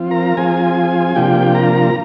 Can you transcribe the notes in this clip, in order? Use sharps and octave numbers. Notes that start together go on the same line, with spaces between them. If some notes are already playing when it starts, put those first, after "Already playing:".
Already playing: F3 C4 F4
A#4 A#5
F3 C4 F4 G#4 G#5
C3 F3 A#3 D4 F4 G4 G5
A#4 A#5